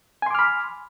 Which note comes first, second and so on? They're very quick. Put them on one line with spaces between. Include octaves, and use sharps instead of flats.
G#5 C6 D6 F6 B5